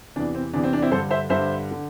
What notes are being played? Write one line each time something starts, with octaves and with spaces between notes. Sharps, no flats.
E2 C3 E3 D4
C4
E2 C3 E3 D4
C4
D4
C4 E4
G2 D3 A4 C5
C5 E5
G2 D3 C5 E5
D3